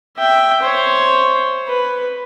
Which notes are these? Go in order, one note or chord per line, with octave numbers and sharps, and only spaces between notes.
E5 G5
C5 C#5
B4